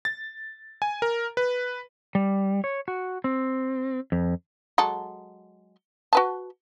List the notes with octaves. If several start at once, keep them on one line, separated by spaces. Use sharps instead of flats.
A6
G#5
A#4
B4
G3
C#5
F#4
C4
F2
F#3 G#3 A4
F#4 B4 A5